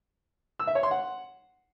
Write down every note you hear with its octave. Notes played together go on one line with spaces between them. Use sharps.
E6
E5
C#5
C6
F#5